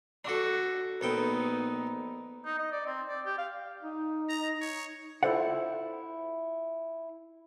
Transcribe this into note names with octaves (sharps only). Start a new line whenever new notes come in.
D4 F#4 A4
A#1 B3 D#4 A4 G5
D#4
D#5
D5
C4
D5
G4
F5
D#4
A#5
C#5
E4 F4 A4 C5 D5 F#5